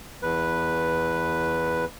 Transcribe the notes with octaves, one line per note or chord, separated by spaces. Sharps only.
E2 B4